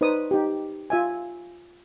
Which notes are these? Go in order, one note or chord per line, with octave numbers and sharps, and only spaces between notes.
D#4 B4 C5 D5 D#6
D#4 G4
F4 E5 G#5